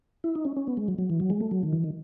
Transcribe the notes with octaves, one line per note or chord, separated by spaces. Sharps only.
E4
D#4
C#4
C#4
B3
G#3
F#3
F#3
E3
F#3
G#3
A3
F#3
D#3
E3
D#3